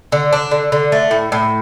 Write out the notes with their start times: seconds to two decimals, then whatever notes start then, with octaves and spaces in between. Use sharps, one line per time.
0.12 D3
0.33 D4
0.51 D3
0.72 D3
0.92 A3
1.11 A2
1.32 A2